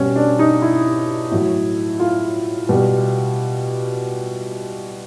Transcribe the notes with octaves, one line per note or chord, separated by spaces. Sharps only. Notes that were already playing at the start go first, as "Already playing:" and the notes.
Already playing: B2 G3 C#4
D4
D#4
E4
A2 F#3
F4
B2 G3